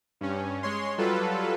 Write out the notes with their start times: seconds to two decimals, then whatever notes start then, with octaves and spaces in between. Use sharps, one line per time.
0.21 G2 C#4
0.63 G#3 C#5 C6
0.98 F#3 G3 F4 A4 B4